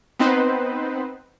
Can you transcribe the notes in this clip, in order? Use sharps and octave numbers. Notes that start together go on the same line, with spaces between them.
B3 C4 D#4 B4 C5